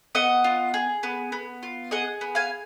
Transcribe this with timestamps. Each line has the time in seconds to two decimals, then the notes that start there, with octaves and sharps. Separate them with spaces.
0.15 B3 D#5 F#5
0.44 F4
0.74 G#4
1.03 B3
1.32 B3
1.63 F4
1.91 G#4 D#5 F#5
2.21 B3
2.35 F5 G#5